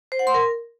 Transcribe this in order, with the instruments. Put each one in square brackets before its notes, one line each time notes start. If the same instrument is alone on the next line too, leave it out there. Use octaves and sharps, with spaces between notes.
[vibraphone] C5
F#5
C6
A#4